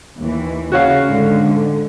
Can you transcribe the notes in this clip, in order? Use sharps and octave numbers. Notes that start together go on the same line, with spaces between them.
D#2 E3
C#3 F#4 C#5 F5
G#2 D3